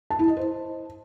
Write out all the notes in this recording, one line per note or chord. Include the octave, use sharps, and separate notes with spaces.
A5
E4
D#5
C5